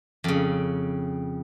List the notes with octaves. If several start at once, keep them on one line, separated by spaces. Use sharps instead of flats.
F2 C#3